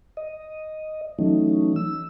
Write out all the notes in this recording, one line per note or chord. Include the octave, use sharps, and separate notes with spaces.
D#5
E3 F#3 A3 C#4 D#4
E6